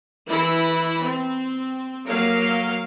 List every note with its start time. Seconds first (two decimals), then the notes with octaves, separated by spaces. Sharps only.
0.28 E3 E4 B5
1.03 C4
2.08 F#3 A#3 A#4 F5